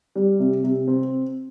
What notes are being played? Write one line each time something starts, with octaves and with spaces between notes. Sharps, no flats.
G3
C3
C3
C4